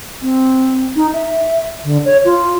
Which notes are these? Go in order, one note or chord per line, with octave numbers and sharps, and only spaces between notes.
C4
D#4
E5
D3
C#5
F4